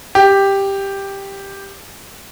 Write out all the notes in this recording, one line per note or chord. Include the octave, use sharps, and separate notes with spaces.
G4